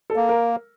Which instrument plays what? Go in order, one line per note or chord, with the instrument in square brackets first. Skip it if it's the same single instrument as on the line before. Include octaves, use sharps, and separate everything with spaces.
[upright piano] A4
[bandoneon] A#3
[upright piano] A#4